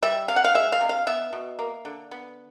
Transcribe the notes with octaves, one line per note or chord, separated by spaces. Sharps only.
G3 E5
C3 F5
F#5
F5
G#3 E5
F5
C3
F5
B3 E5
B2
A#3
D3
B3